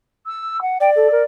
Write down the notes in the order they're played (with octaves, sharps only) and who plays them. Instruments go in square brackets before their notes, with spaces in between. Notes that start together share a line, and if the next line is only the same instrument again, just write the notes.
[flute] E6
F#5
[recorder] D5 [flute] G5
[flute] A4
A#4